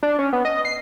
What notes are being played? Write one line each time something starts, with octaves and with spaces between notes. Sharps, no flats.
D4
C#4
B3
D#5
C7